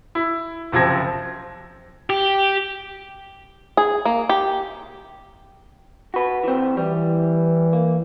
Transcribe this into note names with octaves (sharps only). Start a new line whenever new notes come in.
E4
F#1 C3 F3 C4 G#6 A#6
G4
G#4
A#3
G4
F#4 B4
E3 C4
E3 G3
A#3